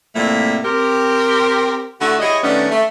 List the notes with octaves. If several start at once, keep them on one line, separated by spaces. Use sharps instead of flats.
A2 C3 F3 G3 A3 A#3
C4 G4 A#4
D3 A3 E4 F#4
G3 E4 G#4 C#5 D#5
D#3 G3 A3 B3 C#4 D4
A3